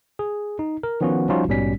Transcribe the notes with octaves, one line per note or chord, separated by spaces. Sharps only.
G#4
D#4
A#4
D#3 F3 B3 C#4 F4 F#4
F3 G3 C#4 D#4 F4 F#4
A#1 G#2 B2 G3 C#4 B6